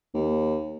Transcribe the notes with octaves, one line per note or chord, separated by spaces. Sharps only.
D#2